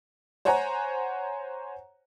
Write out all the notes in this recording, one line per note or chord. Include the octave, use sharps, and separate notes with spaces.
C5 C#5 F#5 G#5 A#5